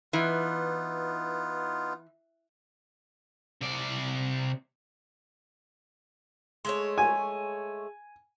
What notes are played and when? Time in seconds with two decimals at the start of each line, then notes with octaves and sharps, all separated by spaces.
0.13 E3 B3 D#4 F4
3.61 C3 D5
6.65 G#3 A3 C#5
6.98 G#5